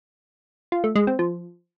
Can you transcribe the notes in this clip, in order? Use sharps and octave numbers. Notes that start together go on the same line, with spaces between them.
F4
A3
G#3
C4
F3